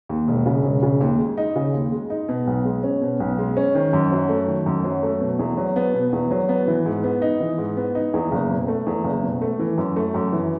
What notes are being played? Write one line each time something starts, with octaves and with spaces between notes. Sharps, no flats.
D#2
E1
C#3
E1
C#3
D#2
G#3
D#4
C#3
D#2
G#3
D#4
B2
B1
G#3
C#4
B2
B1
G#3
C#4
D#3
F#2
F#3
A3
D#3
F#2
F#3
A3
B2
E2
F#3
B3
B2
E2
F#3
B3
E3
G#2
B3
D#4
E3
G#2
B3
D#4
E2
F#1
B2
A3
E2
F#1
B2
A3
E3
F#2
A3
F#2
E3